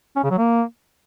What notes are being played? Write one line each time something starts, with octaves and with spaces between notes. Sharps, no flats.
C#4
C#3
F#3
A#3